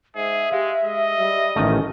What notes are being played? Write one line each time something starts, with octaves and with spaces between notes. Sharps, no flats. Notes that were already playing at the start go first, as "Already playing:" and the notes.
G#2 G#4 E5
G#3 G4 F5
G#3 D#5
G3
A1 D#3 A3 C#4